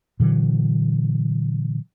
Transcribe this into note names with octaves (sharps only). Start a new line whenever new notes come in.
A#2 D3 E3 F#3